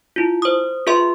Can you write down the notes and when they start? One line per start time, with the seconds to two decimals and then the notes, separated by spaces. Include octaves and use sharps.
0.16 E4 F4
0.42 C5 D#6
0.87 F4 G#4 B4 E5 C6